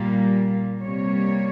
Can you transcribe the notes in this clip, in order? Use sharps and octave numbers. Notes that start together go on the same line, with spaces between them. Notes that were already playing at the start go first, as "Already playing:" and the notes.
Already playing: A#2 G3 A#3
C3 G3 A#3 C#5